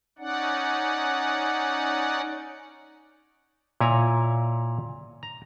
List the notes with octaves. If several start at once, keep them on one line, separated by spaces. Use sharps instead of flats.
C#4 D#4 D5 F#5
A#2 E4 C#5 G#5 A#5
A#5